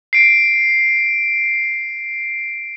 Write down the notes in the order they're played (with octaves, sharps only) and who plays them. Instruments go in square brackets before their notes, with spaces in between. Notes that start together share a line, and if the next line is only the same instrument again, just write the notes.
[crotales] C7 D7